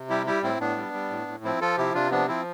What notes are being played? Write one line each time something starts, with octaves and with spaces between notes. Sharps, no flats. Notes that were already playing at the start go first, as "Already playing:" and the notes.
Already playing: C3
G3 E4 G4
G3 E4 G4
A2 C4 E4
A2 B3 D4
G3
G3
A2
A2
F3 C4 E4
F3 F4 A4
C3 E4 G4
C3 D4 F4
F3 B3 D4
F3 C4 E4